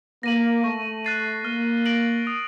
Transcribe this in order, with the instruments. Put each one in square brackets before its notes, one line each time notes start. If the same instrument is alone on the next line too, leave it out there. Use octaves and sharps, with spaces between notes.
[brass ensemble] A#3 [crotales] A#6 D#7 F#7
[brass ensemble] A3 [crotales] C#6
[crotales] F#6 A6 C7 D#7
[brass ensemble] A#3 [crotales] F6
[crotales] A#6 D7 F#7
D#6